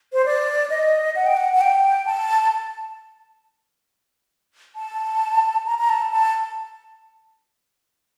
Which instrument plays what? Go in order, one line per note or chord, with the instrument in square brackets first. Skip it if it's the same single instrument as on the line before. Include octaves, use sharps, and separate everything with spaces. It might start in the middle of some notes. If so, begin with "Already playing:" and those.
[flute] C5
D5
D#5
F#5
G5
F#5
F#5
G5
A5
A5
A#5
A#5
A5
A5